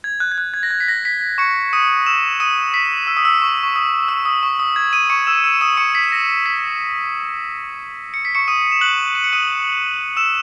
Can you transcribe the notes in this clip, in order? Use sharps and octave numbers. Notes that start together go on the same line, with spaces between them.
G#6
F#6
G#6
F#6
G#6
A#6
G#6
B6
A#6
B6
B6
C#6 C#7
D#6 D#7
E6 E7
D#6 D#7
B6
E6
D#6
E6
C#6
C#6
D#6
E6
D#6
C#6
D#6
G#6
D#6 D#7
C#6 C#7
E6 E7
E6 E7
D#6 D#7
C#6 C#7
B6
A#6
B6
C#7
B6
C#6 C#7
D#6 D#7
E7
F#6 F#7
D#7
C#7
D#6 D#7
E6 E7